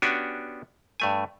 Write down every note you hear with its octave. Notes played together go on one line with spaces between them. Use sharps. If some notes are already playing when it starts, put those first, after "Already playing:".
B3 C#4 D4 F#4 G4 G#5
G2 A3 G#5